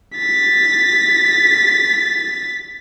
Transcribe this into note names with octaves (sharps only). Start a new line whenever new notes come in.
A6 B6